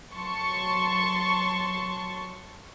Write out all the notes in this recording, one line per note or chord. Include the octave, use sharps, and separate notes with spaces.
F#3 A5 C6 C#6